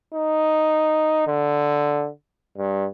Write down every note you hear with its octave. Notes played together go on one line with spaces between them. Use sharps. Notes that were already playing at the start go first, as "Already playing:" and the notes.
D#4
D3
G2